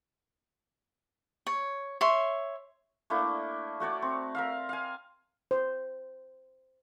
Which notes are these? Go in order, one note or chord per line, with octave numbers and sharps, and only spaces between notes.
C#5
C#5 E5 C6
A3 A#3 D4 E4
A3 F#4 C#5 D5
C4
A#4 E5 F5
F5 G#5
C5